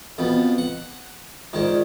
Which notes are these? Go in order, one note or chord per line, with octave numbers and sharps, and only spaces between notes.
F2 B2
F#5
G#2 D#3 F4 G#4 D5